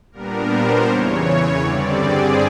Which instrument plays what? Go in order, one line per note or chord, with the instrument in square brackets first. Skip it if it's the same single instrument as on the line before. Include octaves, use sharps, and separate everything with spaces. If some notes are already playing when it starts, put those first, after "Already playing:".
[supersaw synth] A#2 G3 B3 D4 A#4
C5
E2 C#3 E3 C#5
G2 D3 G3 C4 D5
G#4